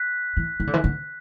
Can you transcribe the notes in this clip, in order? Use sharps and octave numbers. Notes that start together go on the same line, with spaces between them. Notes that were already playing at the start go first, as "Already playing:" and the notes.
Already playing: F#6 B6
E3
E3
D3
E3
D3